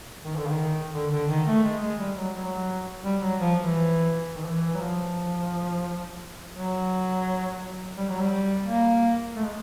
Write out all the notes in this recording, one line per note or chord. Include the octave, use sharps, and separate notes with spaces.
D#3
D3
D#3
D3
D3
D#3
A3
G#3
G#3
G3
F#3
F#3
G3
F#3
F3
E3
D#3
E3
F#3
F3
F#3
G3
F#3
G3
A#3
A3
G#3